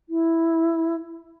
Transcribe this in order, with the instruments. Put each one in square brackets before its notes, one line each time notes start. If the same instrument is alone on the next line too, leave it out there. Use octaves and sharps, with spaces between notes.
[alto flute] E4